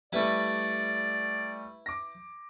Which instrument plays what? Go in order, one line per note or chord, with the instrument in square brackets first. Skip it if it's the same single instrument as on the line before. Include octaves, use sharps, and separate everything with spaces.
[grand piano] G3 A3 [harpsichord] E4 B4 [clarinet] D5
[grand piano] D6 A#6